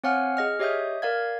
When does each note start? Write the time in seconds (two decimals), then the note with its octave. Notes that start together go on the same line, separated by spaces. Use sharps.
0.04 C4 C#5 F5 F#5 G#5 F6
0.37 G#4 D#5 F6
0.60 G4 C#5 D#5 E5 D#6 G6
1.02 A#4 D5 F5 G#6